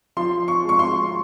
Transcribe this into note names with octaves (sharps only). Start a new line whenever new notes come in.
F3 C6
C#6
G#3 C#6
C6